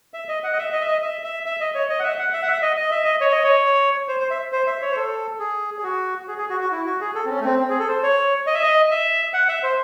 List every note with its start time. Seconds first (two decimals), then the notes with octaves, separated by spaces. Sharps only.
0.14 E5
0.29 D#5
0.44 F#5
0.53 D#5
0.59 E5
0.72 D#5
0.81 E5
0.88 D#5
1.02 E5
1.24 E5
1.46 E5
1.60 D#5
1.75 C#5
1.90 D#5
2.00 F#5
2.04 E5
2.19 F#5
2.33 E5
2.42 F#5
2.47 E5
2.62 D#5
2.77 D#5
2.91 E5
3.04 D#5
3.21 C#5
3.32 D#5
3.44 C#5
4.08 C5
4.20 C5
4.31 E5
4.52 C5
4.67 E5
4.82 C#5
4.91 C5
4.96 A4
5.39 G#4
5.78 G#4
5.83 F#4
6.28 G#4
6.38 G#4
6.50 F#4
6.61 F#4
6.71 E4
6.86 F#4
7.01 G#4
7.15 A4
7.25 C4
7.30 C#4
7.40 A3
7.45 C4
7.59 C4
7.69 G#4
7.79 A4
7.88 C5
8.03 C#5
8.47 D#5
8.55 E5
8.62 D#5
8.91 E5
9.33 F#5
9.49 E5
9.63 C5